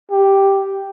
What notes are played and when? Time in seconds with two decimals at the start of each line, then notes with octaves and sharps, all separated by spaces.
0.11 G4